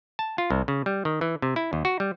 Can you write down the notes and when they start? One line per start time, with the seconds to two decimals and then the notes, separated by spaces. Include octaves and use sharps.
0.19 A5
0.38 F4
0.50 C2
0.68 C#3
0.86 G3
1.05 D#3
1.21 E3
1.42 C3
1.56 E4
1.73 D#2
1.85 F#4
2.00 G3